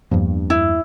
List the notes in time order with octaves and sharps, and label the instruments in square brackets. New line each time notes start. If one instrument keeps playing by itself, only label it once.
[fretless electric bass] E2 F3 A#3 [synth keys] G2
[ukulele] E4